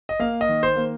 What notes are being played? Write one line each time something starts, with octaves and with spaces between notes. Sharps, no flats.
D#5
A#3 F5
D#5
D#3
C5
A#3